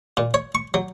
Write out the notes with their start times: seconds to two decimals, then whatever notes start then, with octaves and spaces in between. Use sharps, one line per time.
0.17 A#2
0.34 C#5
0.55 C#6
0.74 F#3